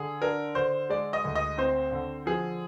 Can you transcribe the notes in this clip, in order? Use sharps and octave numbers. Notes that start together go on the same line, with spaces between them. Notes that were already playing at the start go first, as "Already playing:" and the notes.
Already playing: D3 G#4
D4 A#4
D3 C5
G#3 D5
D#5
D2
D#5
C4 C5
D3
F3 G#4